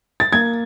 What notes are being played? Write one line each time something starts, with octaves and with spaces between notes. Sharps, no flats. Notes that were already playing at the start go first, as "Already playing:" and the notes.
A6
A#3 G#6